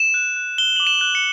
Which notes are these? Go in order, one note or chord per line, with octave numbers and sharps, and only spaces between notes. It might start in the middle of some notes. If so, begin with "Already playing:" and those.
Already playing: E7
F#6
F#6
F#6 G7
D6 F#7
E7
F#6
C#7